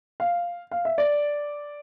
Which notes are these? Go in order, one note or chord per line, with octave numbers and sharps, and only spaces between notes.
F5
F5
E5
D5